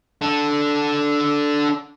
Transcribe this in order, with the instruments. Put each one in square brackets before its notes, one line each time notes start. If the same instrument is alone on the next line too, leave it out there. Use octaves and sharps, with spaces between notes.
[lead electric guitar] D4 A4